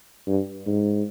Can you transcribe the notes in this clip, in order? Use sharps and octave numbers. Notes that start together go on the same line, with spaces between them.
G2
G#2